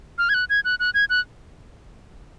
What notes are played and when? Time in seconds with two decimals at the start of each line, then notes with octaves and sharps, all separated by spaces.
0.18 F6
0.29 G#6
0.34 F#6
0.50 G#6
0.65 F#6
0.80 F#6
0.94 G#6
1.10 F#6